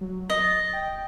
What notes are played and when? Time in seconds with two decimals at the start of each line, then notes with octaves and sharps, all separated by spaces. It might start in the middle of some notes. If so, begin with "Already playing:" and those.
0.01 F#3
0.30 D#5 A6
0.73 G5